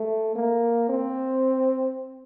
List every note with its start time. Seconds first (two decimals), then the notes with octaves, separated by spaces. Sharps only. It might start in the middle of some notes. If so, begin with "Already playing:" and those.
Already playing: A3
0.36 A#3
0.89 C4